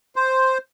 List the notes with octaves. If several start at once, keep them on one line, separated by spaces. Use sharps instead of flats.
C5